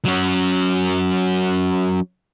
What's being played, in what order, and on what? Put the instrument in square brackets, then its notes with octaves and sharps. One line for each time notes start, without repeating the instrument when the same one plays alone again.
[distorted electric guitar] F#3 C#4